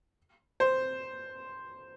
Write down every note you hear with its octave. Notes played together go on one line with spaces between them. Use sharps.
C5